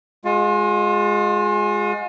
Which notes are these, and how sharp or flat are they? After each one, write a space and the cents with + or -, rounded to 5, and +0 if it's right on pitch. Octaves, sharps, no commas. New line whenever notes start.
G#3 +0 F4 +35